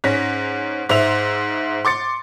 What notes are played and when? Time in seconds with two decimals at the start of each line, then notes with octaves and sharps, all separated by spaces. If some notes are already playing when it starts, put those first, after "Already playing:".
0.04 G#2 C#4 A#6 B6
0.89 G#2 C5 E5 F7
1.85 C6 D6 A6 C#7